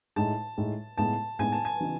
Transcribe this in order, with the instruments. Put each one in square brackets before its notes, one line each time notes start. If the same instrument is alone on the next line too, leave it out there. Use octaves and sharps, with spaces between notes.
[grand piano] A2 G#3 D#4 [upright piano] A5
[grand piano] A2 G#3 D#4
[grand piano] A2 G#3 B3 D#4 [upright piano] A5
[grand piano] A2 G#3 B3 D#4 [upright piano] G#5
[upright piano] A5
G#5
[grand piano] C#3 E3 B3 D#4 F#4